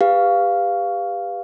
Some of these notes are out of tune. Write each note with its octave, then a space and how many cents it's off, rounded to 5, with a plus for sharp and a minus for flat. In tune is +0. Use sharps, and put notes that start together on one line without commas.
G4 +30 B4 +0 F5 +0